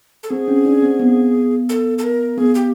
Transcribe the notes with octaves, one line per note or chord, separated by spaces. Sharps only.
A4
C4 G#4
C#4
D4
C4
B3
A4
A4
A#4
B3 G#4
G4